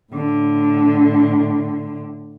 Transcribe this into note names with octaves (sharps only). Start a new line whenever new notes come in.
A2 D3